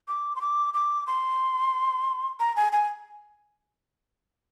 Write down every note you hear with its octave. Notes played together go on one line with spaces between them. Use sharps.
D6
C6
D6
D6
C6
A#5
G#5
G#5